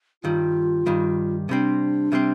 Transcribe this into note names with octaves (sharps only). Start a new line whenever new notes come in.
G2 D#3 G3 F4
G2 D#3 G3
C3 G3 C4 D4
C3 G3 C4